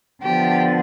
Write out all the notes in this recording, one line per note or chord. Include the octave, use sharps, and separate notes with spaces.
D3 F3 B3 G4